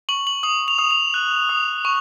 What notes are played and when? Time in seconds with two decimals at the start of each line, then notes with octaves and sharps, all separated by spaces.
0.09 C#6 F#7
0.27 F#7
0.43 D#6 F#7
0.68 F7
0.79 D#6
0.91 F7
1.14 F#6
1.49 D#6
1.85 C#6